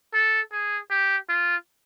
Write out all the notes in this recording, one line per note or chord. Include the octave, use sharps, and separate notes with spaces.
A4
G#4
G4
F4